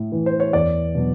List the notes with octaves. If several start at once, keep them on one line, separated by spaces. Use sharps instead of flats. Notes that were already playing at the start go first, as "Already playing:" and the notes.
Already playing: A2
E3
C5
C#5
E2 D5
B2 F#3